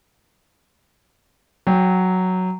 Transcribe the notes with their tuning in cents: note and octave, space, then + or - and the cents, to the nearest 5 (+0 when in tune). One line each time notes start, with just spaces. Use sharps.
F#3 +0 G5 +15